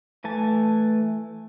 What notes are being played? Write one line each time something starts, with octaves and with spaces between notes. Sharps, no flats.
E3 A3 G#5 A5